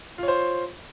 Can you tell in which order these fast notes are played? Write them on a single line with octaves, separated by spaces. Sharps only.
F4 C#5 C5